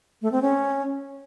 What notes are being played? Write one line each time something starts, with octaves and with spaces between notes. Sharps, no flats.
A3
C4
C#4